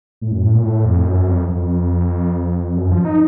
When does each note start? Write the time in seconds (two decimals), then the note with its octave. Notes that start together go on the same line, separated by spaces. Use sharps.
0.22 A2
0.32 F#2
0.43 A2
0.54 A#2
0.64 A2
0.85 F2
1.06 F#2
1.28 F2
1.49 F2
2.77 F#2
2.92 F3
3.05 D#4